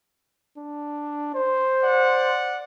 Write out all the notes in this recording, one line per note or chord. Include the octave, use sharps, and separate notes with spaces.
D4
C5
D5 F#5